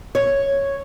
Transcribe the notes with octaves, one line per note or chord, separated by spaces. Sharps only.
C#5